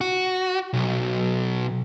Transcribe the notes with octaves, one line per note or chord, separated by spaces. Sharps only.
F#4
B1